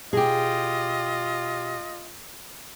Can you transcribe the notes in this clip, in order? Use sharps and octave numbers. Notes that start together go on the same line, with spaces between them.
B2 F4 G4 G#4 D#5